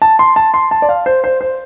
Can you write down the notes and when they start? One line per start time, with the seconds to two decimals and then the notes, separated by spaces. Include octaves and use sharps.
0.02 A5
0.19 C6
0.36 A5
0.54 C6
0.71 A5
0.82 D5
0.89 F5
1.06 C5
1.24 C5
1.41 C5